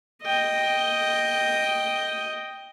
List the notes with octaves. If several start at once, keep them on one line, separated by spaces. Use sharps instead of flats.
D#5 G5